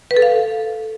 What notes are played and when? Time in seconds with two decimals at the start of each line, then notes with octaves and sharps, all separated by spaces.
0.11 B4
0.16 A4
0.22 F5